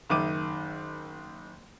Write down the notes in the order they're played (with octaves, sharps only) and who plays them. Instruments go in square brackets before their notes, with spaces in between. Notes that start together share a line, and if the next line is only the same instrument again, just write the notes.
[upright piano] F#1 D#3 E5 D6 D#7